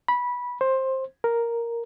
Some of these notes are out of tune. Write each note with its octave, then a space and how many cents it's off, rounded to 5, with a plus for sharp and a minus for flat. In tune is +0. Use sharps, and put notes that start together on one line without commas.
B5 -15
C5 +15
A#4 +0